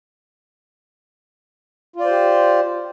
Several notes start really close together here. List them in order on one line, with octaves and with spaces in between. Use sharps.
F4 D5 C5 G4